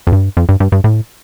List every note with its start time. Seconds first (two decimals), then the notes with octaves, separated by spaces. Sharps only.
0.07 F2
0.12 G2
0.37 F2
0.49 G2
0.60 G2
0.72 G2
0.84 A2